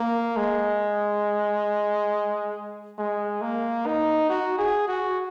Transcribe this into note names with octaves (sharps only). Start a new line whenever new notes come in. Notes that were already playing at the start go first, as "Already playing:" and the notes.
Already playing: A#3
G#3
G#3
A#3
D#4
F#4
G#4
F#4